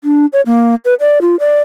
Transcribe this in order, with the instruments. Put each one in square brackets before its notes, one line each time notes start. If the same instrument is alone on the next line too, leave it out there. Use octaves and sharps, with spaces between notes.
[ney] D4
C#5
A#3
B4
D5
F4
D5